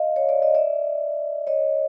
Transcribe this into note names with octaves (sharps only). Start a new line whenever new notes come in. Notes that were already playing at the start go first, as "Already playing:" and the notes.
Already playing: D#5 F5
C#5
D5
D#5
D5 E5
C#5 D#5